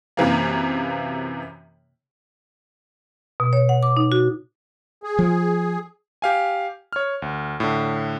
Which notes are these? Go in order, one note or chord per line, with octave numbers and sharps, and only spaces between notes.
F#2 C3 E3 A#3
B2
C#5
F#5
D6
D#4
F#4
G#4
F3
G4 F5 G#5
C#5 F6
D2
A2 D3